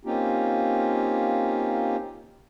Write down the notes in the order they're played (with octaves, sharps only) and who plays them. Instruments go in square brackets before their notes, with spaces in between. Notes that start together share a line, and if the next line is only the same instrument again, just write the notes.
[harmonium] A#3 C4 C#4 D#4 F4 G4